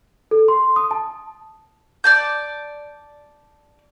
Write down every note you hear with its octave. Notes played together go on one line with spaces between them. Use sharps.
A4
C6
D#6
A5
D5 A5 G6